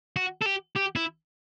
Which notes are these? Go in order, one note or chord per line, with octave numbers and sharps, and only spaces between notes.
F#4
A4
G4
G4
E4